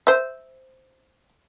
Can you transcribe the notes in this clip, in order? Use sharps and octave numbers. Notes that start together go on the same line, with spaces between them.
C5 E5